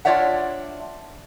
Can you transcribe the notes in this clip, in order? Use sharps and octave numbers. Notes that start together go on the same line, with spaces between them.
D4 F4 C#5 D5 E5 F#5